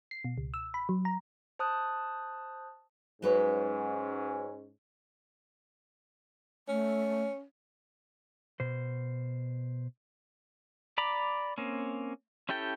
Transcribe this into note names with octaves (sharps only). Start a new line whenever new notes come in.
C7
B2
C#2
E6
B5
F#3
A#5
C5 A5 D#6 F#6
G#2 F#3 C#4 B4 C#5
A3 C#4
B2 C5
D5 A#5 B5 D6
A#3 C4 C#4
C#4 E4 G4 A4 G5